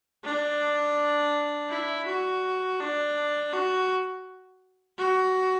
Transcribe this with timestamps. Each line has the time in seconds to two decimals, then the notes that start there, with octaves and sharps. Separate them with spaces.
0.24 D4
1.69 E4
2.06 F#4
2.80 D4
3.52 F#4
4.98 F#4